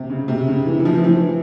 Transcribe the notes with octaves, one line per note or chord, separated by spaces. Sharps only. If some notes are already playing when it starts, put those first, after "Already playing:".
Already playing: C3
C#3
C3
C#3
E3
E3
F3
E3